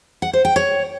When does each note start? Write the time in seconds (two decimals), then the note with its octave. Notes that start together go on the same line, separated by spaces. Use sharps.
0.22 F#5
0.33 C5
0.45 G5
0.56 C#5